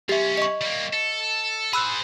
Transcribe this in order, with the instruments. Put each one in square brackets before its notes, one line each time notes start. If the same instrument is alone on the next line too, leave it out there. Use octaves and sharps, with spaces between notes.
[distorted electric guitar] B1 C#4 [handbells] G4 E5
[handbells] D#5 C#6
[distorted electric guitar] G3 A#3
A4
[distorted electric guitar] G#4 C5 [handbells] B5 E6 F#6